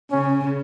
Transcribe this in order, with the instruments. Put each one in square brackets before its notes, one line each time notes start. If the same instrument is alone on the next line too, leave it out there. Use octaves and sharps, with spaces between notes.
[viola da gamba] C#3 [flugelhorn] C#4